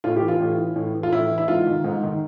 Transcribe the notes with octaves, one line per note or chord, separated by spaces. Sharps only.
A2 F4
G4
E3
F4
A2
E3
A2
E3
F4
A2 E4
E3
E4
G#2 F4
D#3
G#2
D#3